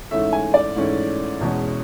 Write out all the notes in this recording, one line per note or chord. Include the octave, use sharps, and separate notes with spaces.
G#2 E3 A3 C#4 E5
G#5
D5
G#2 E3 A3 C#4
E2 B2 G#3 C#4